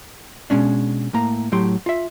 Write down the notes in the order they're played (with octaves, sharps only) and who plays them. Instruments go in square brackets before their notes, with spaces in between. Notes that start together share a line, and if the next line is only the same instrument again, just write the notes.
[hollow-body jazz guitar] B2 G#3 C#4 D4
A2 A#3 A#5
A2 F#3 G4 C6
F4 E5